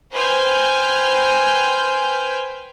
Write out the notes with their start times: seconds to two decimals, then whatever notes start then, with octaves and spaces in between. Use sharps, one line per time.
0.12 B4 C5 G5 G#5 F6 G6